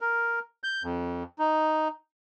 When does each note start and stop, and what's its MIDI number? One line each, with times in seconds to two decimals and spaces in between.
0.01 0.39 70
0.64 0.83 91
0.84 1.23 41
1.39 1.88 63